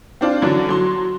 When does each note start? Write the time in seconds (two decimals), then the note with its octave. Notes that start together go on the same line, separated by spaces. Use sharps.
0.21 C4 D4 F4
0.42 D3 E3 F#3 C#4 D4
0.69 F#3 C6